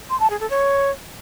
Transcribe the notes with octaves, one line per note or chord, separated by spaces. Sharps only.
C6
A5
G#4
A4
C#5